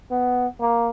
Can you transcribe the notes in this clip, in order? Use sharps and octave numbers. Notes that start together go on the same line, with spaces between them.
B3
A#3